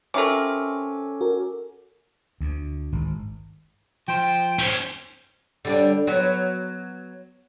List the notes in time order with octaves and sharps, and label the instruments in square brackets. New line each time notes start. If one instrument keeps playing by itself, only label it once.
[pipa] C3 F3 A#4 [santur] C#4 [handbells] A4 D6
[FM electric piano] F#4 A#4
[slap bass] D2
G#1
[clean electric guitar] F3 C5 [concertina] G5
[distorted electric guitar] C#4 C5
[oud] D3 G3 D4
F#3 B3